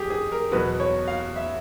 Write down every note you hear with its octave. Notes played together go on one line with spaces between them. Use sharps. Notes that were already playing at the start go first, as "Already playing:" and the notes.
Already playing: F2 G4 G#4
G#4
A#4
E2 B2 F#3 B4
C#5
F5
E5